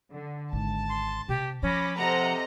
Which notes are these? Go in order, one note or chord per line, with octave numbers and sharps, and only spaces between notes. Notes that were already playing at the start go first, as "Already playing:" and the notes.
D3
G#1 A5
C6
C3 G4
F3 C#4 B5 D6 A#6
C3 A4 C5 D#5 F#5 A#5